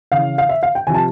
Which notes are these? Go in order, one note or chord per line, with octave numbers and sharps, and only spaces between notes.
C#3 E3 F5
F5
E5
F5
G5
C3 F3 G#5
A5